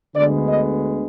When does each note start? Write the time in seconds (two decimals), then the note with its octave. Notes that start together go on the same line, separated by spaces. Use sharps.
0.14 D2 D3 G#3 B3 D5
0.49 D#5